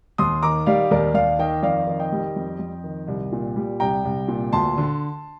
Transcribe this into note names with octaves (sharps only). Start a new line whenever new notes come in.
D#2 C6 D#6
D#3 A#5 D6
G3 D5 F5
D#2 A#4 D5
D#2 D5 F5
D#3 D#5 G5
F2 D5 F5
D#3
D#5 G5
G3
F2
F2
D#3
C2
A#2
G3
C2 G5 A#5
C2
A#2
D2 A5 C6
D3